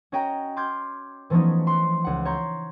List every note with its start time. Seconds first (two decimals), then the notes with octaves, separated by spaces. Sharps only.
0.12 C#4 F#4 C#5 D#5 G5 A#5
0.56 C6 D6 F6 G6 G#6
1.30 E3 F3 A3 B3 C#4 D#4
1.67 C6 F#6
2.04 C#2 F#5
2.25 C#5 A#5 C6 G6